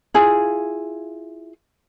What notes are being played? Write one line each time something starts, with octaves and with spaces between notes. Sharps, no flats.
E4 F4 G#4